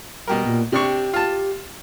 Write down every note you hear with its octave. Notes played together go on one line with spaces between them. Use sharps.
B2 G3 G4 A#4
A#2
C3 D4 G4 C#6
F4 A5